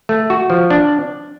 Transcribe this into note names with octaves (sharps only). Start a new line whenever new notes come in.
A3
F#4
F3
D4